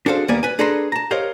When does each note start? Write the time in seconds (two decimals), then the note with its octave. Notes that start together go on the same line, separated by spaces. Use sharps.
0.06 D4 F#4 G#4 A4 C5 F5
0.28 D#2 G3 A#3 B3 D5 G#5
0.43 B4 G#5
0.59 D4 G#4 A4 B4 A#5 C6
0.92 A5 A#5
1.11 G4 A#4 C5 C#5 D#5 F5